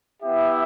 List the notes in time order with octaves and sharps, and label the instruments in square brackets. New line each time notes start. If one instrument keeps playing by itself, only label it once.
[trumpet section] B3 E4 G4 E5